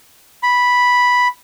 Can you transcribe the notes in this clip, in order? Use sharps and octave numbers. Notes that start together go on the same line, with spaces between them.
B5